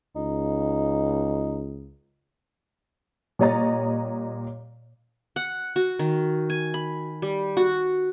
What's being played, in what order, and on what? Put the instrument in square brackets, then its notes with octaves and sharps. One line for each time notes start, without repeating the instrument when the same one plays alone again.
[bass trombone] C#2 [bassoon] D#4
[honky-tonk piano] A#2 G3 C#5 D#5 A#5 A6
[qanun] F#5
F#4
D#3
G#5
B5
G3
F#4